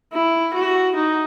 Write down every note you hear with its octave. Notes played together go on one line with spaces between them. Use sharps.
E4
F#4
D#4